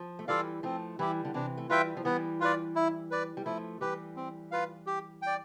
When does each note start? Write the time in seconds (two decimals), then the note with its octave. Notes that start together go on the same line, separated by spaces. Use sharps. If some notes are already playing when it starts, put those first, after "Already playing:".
Already playing: F3
0.19 A3
0.28 E3 G3 F4 A4 D5 F5
0.63 F3 A3 C4
0.99 E3 G3 E4 G4
1.25 D3
1.34 C3 E3 D4
1.57 A3
1.69 E3 G3 F4 B4 E5 G5
1.97 F3
2.05 E3 G3 B3
2.40 F4 B4 D5
2.76 E4
3.11 B4 D5
3.37 G3
3.45 F3 A3 E4
3.81 E3 G3 G4 B4
4.16 C4
4.52 F4 B4 F5
4.86 G4
5.22 D5 G5